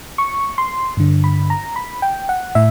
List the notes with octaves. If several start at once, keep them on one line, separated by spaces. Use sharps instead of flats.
C#6
C6
G2 D3
B5
A#5
B5
G5
F#5
A2 E5